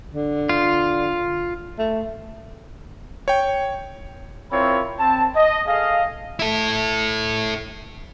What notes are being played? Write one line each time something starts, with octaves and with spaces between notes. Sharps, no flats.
D3
F4
A3
C#5 G5
C4 E4 F4 A#4 C#5 B5
C4 A5
D#5
G#4 A4 D#5 F5
E4 A4